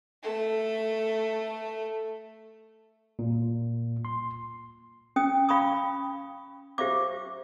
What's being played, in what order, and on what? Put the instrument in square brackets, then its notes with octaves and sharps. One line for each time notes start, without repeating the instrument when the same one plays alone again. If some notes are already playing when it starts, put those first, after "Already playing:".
[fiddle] A3 A4
[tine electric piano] A#2
C6
[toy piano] C#4 G5 D#6
F5 B5 C#6 D#6
G4 C5 E5 F5 D6